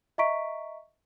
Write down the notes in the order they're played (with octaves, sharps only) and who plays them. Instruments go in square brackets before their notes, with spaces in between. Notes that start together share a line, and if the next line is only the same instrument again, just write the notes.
[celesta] D#5 E5 A#5 C#6 B6 D7